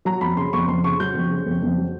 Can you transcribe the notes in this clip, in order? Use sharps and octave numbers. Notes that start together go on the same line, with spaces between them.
F#3 A#5
F2 B5
C#3 C6
F2 C#6
F2 C6
C#3 C#6
F#3 G6
F2
C#3
F2
F2
F#3